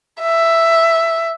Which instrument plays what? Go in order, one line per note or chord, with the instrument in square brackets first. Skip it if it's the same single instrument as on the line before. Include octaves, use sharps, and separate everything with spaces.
[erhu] E5